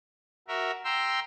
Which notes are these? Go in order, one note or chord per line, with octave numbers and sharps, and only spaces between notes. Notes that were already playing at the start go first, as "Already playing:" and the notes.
F#4 A#4 E5
G5 A#5 C6 E6